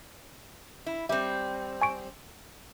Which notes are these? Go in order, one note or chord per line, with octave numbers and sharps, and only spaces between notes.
E4
G3 C4 E5
G#5 C#6 D7